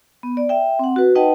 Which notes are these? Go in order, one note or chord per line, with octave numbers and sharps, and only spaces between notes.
B3
D5
E5 G5
C4 F#5
F#4 B4
D#4 B4 D#5 F#5 G5 A5